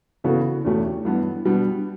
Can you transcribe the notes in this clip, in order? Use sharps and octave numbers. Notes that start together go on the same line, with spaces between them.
C#3 E3 B3 F#4 A4
E2 B2 A3 C#4 G4
G2 E3 B3
B2 G3 B3 D4